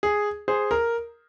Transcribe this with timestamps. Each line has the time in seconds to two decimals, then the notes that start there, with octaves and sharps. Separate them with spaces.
0.03 G#4
0.48 G#4 C5
0.71 A#4